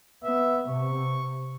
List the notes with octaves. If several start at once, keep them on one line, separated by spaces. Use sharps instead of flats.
B3 E5
C3 C#6